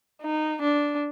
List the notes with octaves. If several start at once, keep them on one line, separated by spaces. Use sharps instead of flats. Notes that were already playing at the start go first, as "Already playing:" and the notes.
D#4
D4